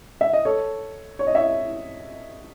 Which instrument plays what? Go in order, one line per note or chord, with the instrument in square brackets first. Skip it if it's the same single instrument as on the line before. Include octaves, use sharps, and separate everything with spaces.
[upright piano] E5
D#5
A4 C#5
C#5
D#5
C#5 E5